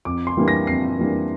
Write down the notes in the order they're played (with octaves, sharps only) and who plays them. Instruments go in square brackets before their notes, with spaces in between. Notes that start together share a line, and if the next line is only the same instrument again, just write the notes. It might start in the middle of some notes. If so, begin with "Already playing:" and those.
[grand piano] F2 D6
C6
E3 G3 A#3 D4
A#6
F2 C7
E3 G3 A#3 D4